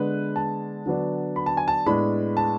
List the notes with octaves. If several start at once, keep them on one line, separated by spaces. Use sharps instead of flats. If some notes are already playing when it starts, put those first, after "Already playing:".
Already playing: D3 G#3 B3 D4 B4
A5
D3 F#3 B3 D4
B5
A5
G#5
A5
A2 G#3 B3 D4 B5
A5